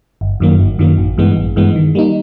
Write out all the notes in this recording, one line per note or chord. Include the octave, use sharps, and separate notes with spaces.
G1
F#2 D#3 F#3 A#3
G1
F#2 D#3 F#3 A#3
A1
G2 E3 G#3 B3
A1
G2 E3 G#3 B3
D#3
G3 A#3 D#4